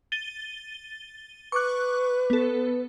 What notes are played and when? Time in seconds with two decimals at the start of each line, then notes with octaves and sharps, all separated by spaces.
0.12 A6 D#7 G7
1.52 B4 C#6 D6 F#6
2.30 B3 A4